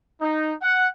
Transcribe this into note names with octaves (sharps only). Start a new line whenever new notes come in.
D#4
F#5